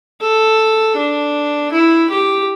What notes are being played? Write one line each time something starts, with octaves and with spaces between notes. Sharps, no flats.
A4
D4
E4
G4